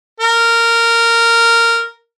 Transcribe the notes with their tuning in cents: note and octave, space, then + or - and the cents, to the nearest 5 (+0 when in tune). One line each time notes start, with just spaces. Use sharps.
A#4 -10